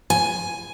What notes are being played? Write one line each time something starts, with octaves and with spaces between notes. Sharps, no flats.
G#5